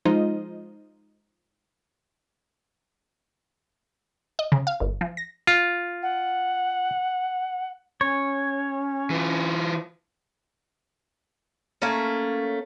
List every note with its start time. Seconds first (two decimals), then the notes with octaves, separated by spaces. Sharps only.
0.05 F3 G#3 D#4 F4 C5 D#5
4.39 D#5
4.52 C#3
4.67 F5
4.80 G1
5.01 F3
5.17 A#6
5.47 F4
6.02 F#5
8.01 C#4 C#5
9.10 E3 F4
11.82 A3 A#3 C#4